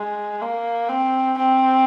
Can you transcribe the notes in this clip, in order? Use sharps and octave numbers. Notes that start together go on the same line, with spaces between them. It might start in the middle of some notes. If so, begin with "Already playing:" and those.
Already playing: G#3
A#3
C4
C4